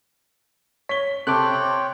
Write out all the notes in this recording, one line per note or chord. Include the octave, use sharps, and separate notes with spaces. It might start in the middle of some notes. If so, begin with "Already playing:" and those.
C#5 B6 G7
C3 A4 C#5 G5 C6 D6 F#6